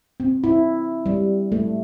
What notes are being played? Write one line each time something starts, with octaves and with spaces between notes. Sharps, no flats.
C4
E4
G3
A3